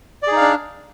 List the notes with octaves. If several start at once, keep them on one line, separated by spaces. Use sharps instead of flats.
D4 D#4 G#4 D5 F5